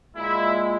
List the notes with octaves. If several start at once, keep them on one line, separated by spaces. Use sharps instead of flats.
A#2 G#3 E4